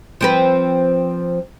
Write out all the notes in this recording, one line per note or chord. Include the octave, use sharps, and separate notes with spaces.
F3 C4 B4